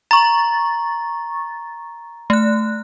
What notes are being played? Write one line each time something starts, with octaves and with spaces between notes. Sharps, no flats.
A#5 C#6 A6
A3 F#6